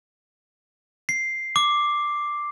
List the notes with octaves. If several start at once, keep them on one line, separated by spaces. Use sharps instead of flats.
C7
D6